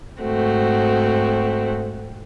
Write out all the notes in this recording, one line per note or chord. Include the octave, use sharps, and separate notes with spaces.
G#2 A3 C4 F#4